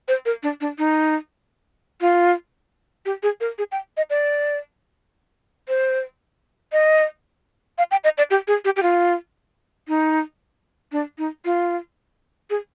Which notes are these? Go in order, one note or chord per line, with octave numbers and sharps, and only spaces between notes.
C5
A#4
D4
D4
D#4
F4
G4
G#4
A#4
G#4
G5
D#5
D5
C5
D#5
F5
G5
D#5
D5
G4
G#4
G4
G4
F4
D#4
D4
D#4
F4
G#4